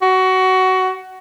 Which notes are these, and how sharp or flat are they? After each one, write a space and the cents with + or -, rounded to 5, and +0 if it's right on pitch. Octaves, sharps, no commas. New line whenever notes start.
F#4 +20